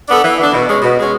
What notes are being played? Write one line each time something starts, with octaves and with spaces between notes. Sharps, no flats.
B3 D4 A4
E3
B3 D4 A4
B2
G#3 C#4
B2
G#3 C#4